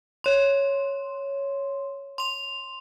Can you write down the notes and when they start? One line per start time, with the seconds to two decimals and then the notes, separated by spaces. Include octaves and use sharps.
0.24 C#5 C6
2.18 C6 F7